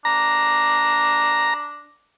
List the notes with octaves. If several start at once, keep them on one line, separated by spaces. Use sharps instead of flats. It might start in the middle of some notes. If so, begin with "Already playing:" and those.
D4 A#5